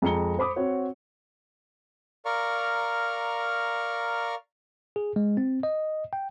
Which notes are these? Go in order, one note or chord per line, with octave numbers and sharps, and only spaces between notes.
F2 G#3 A#5 C#7 G7
C5 B5 D6 D#6
C4 F#4 C#5 F#5
A#4 D5 F5 A#5 C#6 F6
G#4
G#3
C4
D#5
G5